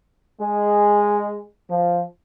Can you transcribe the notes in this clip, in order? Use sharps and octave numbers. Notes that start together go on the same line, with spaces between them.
G#3
F3